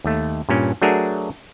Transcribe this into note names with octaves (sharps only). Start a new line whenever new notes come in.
D#2 A3
G2 A#2 C#4
F#3 A3 D4 F#4 G#4 A#4